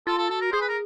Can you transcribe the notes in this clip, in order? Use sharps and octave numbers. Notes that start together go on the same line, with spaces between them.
F4 A4
A4
F#4 A4
A#4
G#4 C5
B4
A#4